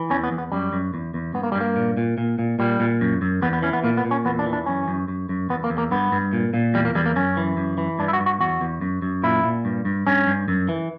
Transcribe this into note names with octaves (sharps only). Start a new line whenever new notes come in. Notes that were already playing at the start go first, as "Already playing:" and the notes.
Already playing: E3
E2 C#4
B3
E2
B3
F#2 G3
F#2
E2
E2
G2 B3
A#3
G3
G2 A#3
A#2
A#2
A#2
A#2
A#2 G3
A#2
F#2
F#2
E2 B3
B3
E3 C#4
B3
A#2 A#3
B3
A#2
C#4
E2 B3
D4
E3
D4
F#2 C#4
F#2
F#2
F#2
E2 B3
A#3
E2
A#3
G2 B3
G2
A#2
A#2
E2 G3
A#3
E2 G3
A#3
F#2 C#4
E3
F#2
E3
G2 D4
E4
F#4
G2
F#4
E2 F#4
E2
F#2
F#2
A#2 E4
A#2
G2
G2
G2 C#4
G2
F#2
E3